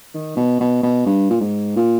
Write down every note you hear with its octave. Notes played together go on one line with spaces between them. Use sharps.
D#3
B2
B2
B2
G2
A#2
G#2
A#2